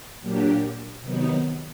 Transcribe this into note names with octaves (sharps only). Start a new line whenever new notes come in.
A#2 F#3 A#3 D4 G4
C3 D#3 F#3 B3 D#4